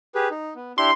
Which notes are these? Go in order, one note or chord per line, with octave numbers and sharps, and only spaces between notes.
G4 G#4 B4
D#4
B3
D4 E4 G4 C6